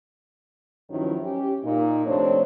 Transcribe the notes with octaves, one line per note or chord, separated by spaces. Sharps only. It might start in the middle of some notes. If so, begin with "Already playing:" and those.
G2 D#3 F3 F#3 C#4 E4
C#4 G4
A#2 D#4
F2 C3 A3 C4 D4 C#5